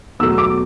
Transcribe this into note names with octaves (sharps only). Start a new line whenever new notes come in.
E2 B2 F#3 A3 E6
D6